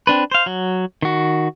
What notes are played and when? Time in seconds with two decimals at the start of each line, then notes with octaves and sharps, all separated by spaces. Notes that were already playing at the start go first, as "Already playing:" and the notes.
0.07 C4 D4 B4
0.31 C5 F5
0.46 F#3
1.02 D#3 F#4